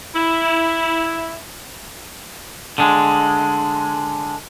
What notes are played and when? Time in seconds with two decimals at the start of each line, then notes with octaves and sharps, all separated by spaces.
0.16 E4
2.78 D3 G#3